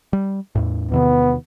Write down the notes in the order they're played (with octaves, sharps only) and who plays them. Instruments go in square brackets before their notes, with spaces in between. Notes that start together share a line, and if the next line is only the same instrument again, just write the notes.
[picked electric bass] G3
E2 A2
[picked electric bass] E2 C3 D#3 [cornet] B3